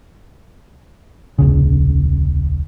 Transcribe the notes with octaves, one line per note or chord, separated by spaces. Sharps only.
D#1 C2 C#3